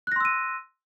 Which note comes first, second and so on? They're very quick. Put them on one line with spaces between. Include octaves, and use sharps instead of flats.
F#6 A#6 C6 E6 D#7